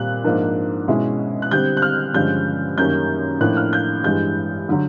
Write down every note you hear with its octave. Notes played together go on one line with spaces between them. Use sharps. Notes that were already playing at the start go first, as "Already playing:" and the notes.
Already playing: A#2 G3 C4 F#6
G#2 F3 A#3 D4
B2 G#3 C#4 E4
F#6
D3 G3 C4 G6
F#6
F6
G2 D3 F3 G#3 C#4 G6
F#2 D#3 G3 A#3 C#4 G6
A2 F3 A#3 D4 F#6
F6
G6
G2 E3 G#3 G6
D3 F#3